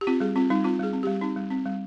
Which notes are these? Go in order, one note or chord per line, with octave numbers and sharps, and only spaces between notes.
G4
C4 F4
G3 G#4
C4 F4
G3 D#4
C4 F4
G3 G#4
C4
G3 G4
C4 D#4
G3
C4
G3